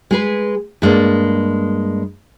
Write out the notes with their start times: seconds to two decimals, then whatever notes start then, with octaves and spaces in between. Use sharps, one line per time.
0.11 G#3 G#4 B4
0.82 G2 G#3 A#3 D5